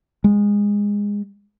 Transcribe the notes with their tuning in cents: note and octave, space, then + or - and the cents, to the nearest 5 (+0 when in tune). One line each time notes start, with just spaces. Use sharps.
G#3 -20